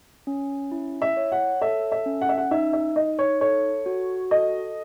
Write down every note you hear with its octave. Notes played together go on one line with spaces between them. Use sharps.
C#4
E4
E5
C#5
F#5
A4 E5
E5
C#4
F#5
E5
F#5
D#4 E5
E5
D#4 D#5
C#5
A4 C#5
F#4
A4 D#5